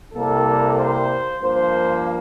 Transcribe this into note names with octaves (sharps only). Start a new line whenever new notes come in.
C2 C3 G3 A#3 A4
C5
G2 F3 A#3 C5